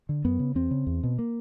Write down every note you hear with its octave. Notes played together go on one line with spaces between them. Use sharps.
D3
F#2 B3
C#3
E2 C4
C#3
E2
B2
A#3